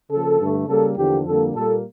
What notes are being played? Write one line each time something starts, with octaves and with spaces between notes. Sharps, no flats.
C#3 F3 A#3 A4
G2 D3 A3
C#3 G3 A#3 A4
E2 D3 F3 A#3 G4
F2 D3 G3 A#3 A4
A#2 G3 A#3 A4